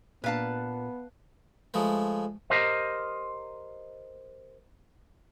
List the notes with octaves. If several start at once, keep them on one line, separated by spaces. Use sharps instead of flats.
A#2 B3 D4 B4 F5 A5
F3 G#3 A3 B4
G4 A#4 C5 D#5